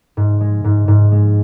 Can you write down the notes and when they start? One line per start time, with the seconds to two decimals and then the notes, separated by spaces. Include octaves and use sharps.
0.17 G#2
0.41 G#3
0.64 G#2
0.88 G#2
1.12 G#3